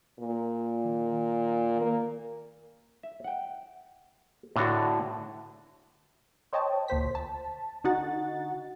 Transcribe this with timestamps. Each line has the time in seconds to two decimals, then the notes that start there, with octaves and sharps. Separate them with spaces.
0.19 A#2
0.85 D#3
1.81 A#3
3.03 E5
3.24 F#5 G5
4.56 A2 D3 D4 F#4
6.53 C5 C#5 D#5 G5 A5
6.88 D2 A#2 C5 B6
7.15 A5
7.84 D3 D#4 F#4 F#5 A6